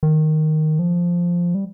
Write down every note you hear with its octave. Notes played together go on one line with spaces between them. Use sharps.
D#3
F3
G3